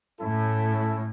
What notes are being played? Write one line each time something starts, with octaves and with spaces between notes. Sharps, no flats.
A2 C#4 E4 A4